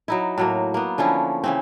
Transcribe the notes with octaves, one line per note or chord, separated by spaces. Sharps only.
F#3 D#4 E4
A2 F#3 A#3
A#3 B3
D3 F3 C#4 E4
C#3 E3 C4